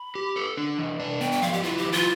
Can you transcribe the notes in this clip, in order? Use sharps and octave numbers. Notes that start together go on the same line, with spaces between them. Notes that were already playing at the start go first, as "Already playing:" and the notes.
Already playing: B5
G4
A4
D4
E3
D4
B3 G5
G5
F3 F5
G4
E4 F4
G4
F3
F4